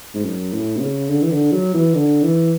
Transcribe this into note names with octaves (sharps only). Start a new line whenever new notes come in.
G#2
F#2
A2
B2
C#3
D3
E3
D3
F#3
E3
D3
E3